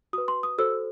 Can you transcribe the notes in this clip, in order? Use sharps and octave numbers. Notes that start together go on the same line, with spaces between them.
F#4 B4 D#6
C6
D#6
F#4 A4 C5 E6